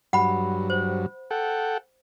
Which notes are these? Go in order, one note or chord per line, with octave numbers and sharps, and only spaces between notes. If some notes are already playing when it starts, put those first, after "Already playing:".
G2 F#3 F#5 B5
C5
A4 F#5 G5